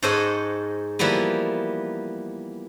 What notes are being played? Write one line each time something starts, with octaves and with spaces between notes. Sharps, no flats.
G#2 A4 C5 C#5 D#5 F#5
E3 F3 G3 A#3 B3